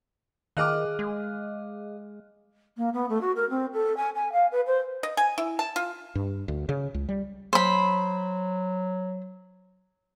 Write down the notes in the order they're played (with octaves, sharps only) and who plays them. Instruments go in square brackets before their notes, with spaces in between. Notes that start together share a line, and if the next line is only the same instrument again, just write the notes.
[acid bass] D#3 [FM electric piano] G#4 D#5 F5 [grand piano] D6 F6 F#6
[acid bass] G#3
[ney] A#3
B3
A3
F#4
A#4
C4
A4
G#5
G#5
F5
B4
C5
[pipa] D#5
G#5
E4
A5
F4
[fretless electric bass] G2
D2
C#3
C#2
G3
[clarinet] F#3 [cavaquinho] C5 B5